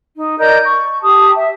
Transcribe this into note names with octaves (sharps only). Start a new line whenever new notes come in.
D#4
A#4 D5 D#5 G6
C#6
G4 A5 D#6
E5